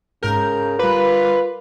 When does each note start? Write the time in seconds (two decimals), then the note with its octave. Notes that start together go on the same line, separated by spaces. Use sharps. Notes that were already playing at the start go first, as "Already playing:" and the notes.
0.23 G#2 C#3 A#4 G6
0.79 G3 F4 B4 D6